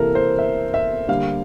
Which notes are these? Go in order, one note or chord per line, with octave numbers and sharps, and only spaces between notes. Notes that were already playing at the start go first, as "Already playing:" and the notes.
Already playing: C3 E3 A#3 A4 A#4
C5
E5
E5
D3 G3 A#3 F5